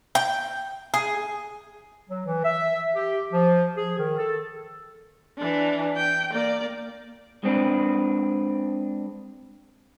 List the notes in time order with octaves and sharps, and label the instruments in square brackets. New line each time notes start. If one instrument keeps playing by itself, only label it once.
[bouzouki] G5
G#4
[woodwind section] F#3
E3
E5
G4
F3
G#4
D#3
A4
[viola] E3 D4
G5
A#3 D5
[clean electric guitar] G#3 C4 D4 B4